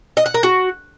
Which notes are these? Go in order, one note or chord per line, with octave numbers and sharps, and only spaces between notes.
D#5
F#5
A#4
F#4